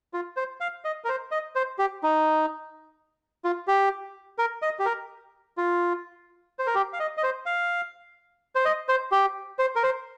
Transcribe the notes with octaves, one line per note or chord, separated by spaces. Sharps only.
F4
C5
F5
D#5
A#4
C5
D#5
C5
G4
D#4
F4
G4
A#4
D#5
G4
A#4
F4
C5
A#4
G4
F5
D#5
D#5
C5
F5
C5
D#5
C5
G4
C5
A#4
C5